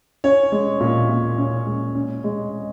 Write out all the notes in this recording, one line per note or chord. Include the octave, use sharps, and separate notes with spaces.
C#4 C#5
G#3
A#2
A#2
C#4
G#3
C#4
G#3